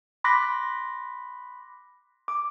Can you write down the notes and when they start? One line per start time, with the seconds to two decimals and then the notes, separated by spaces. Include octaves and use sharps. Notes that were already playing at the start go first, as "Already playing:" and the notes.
0.24 B5 C6 D6 F#6 A#6 B6
2.28 D6